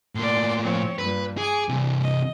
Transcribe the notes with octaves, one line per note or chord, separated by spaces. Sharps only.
A2 A#3 D5 C6
F3 C4 C#5
G2 A#2 G3 B4
G#4 G#5 D6
C3 E3 G3
D#5